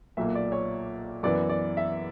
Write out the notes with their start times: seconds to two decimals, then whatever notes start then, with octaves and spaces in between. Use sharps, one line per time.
0.17 B1 A#2 A#3 E5
0.35 D5
0.52 C#5
1.23 F#2 E3 B3 D5
1.49 D5
1.77 E5